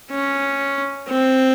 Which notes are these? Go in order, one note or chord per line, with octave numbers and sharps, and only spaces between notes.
C#4
C4